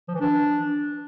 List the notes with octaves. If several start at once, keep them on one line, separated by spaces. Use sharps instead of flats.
F3
E3
D4